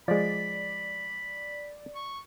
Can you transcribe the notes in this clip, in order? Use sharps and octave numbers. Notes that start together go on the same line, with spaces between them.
F3 G#3 D5 B5
C#6